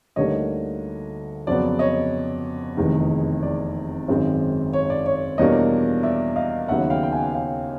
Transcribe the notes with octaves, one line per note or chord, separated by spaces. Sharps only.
D2 D3 G3 A#3 D#4 C#5 D#5
F2 C#3 F#3 B3 D5
C#5 D#5
F1 E2 C3 D#3 G#3
D5
G#1 F#2 D#3 G#3 C4
C#5
D5
C#5
E2 B2 G3 A#3 D4 C#5 D#5
D5 E5
D#5 F5
D#2 C#3 F#3 B3 D#4 E5 F#5
F5 G5
G5
F#5 G#5
F5 G5